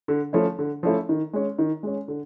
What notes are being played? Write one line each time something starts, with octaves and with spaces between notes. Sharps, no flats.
D3
F3 A3 C#4 E4
D3
F3 A3 C#4 E4
D#3
G#3 C#4
D#3
G#3 C#4
D3